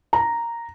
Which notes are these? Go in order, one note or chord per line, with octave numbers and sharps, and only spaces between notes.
A#5